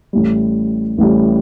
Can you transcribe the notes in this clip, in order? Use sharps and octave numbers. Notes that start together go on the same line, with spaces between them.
A1 A2 G3
A1 A2 G3